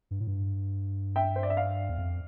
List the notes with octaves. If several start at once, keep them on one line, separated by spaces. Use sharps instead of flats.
G2
A2
G2
E5 G5
C5
D5
E5
D5 F5
E2
F2